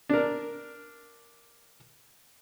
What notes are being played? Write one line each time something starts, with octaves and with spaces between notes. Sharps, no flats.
D4 A#4